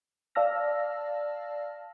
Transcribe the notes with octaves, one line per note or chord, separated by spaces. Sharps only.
D5 F5 A5 E6 F6 A#6